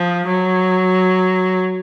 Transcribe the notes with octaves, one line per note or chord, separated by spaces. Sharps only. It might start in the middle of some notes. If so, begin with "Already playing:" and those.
Already playing: F3
F#3